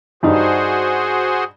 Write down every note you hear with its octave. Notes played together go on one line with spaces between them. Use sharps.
G2 D4 D#4 F#4 G#4 C5